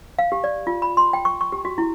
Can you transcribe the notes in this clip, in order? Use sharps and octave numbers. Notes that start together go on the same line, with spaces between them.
F5
G4
D5
F4
B5
C6
G5
C#6
C#6
G4
F#4
E4